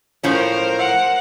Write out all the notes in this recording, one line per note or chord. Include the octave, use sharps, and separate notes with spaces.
A2 F3 C#4 A#4 C5
F#5